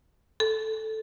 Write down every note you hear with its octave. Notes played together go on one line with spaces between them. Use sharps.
A4